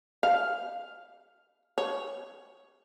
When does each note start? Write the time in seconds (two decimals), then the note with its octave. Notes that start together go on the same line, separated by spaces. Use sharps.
0.23 F5
1.78 C#5